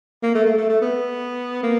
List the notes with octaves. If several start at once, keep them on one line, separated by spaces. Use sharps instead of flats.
A#3
A3
A3
A3
A3
B3
A#3